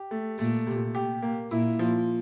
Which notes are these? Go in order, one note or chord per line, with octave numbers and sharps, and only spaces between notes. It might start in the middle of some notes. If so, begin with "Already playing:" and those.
Already playing: G4
A3
A#2 A3
C3
G4
A#3
A#2 E4
F3